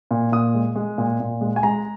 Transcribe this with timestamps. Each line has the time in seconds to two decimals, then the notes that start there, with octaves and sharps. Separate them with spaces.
0.11 A#2
0.32 A#2 D#6
0.55 G#3
0.76 G#3
0.98 A#2
1.20 A#2
1.41 G#3
1.56 G#5
1.63 G#3 A#5